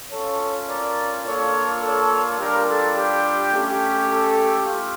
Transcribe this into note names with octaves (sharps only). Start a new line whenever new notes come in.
C#4 F4 A4 C#5
A#4 D5
A#3 D4 F4 A4 C#5
A4 C#5
G3 D4 F4 G4 A#4
A4
G4
A3 C#4 G4
A4
F4